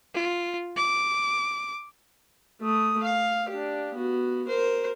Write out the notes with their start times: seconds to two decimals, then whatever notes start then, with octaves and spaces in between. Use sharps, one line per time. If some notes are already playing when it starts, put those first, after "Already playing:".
0.14 F4
0.76 D6
2.61 A3 D#6
3.03 F5
3.49 D4 G4
3.94 B3 F#4
4.47 A#4 C5